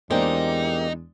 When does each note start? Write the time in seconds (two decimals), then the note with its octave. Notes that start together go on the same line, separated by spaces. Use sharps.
0.11 E2 G#3 A#3 C4 D4 D#4 G4